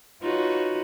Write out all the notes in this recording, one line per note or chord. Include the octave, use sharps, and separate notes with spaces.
D#4 F4 F#4 B4 C#5